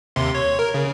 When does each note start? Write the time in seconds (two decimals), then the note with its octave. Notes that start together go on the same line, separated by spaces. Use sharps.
0.16 D#2 C3 C6
0.35 C#5
0.59 A#4
0.74 C#3